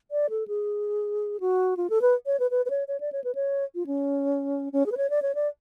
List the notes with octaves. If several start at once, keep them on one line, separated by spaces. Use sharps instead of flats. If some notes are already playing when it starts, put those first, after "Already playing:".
D5
A4
G#4
F#4
F4
A4
B4
C#5
B4
B4
B4
C#5
C#5
D5
C#5
B4
C#5
F4
C#4
C#4
G#4
B4
C#5
D5
C#5
D5